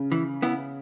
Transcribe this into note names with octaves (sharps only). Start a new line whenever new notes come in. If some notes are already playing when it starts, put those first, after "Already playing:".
Already playing: C#3
E3
B3 E4